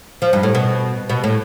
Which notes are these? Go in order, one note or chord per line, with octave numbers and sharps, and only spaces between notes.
F3
G2
A2
B2
B2
A2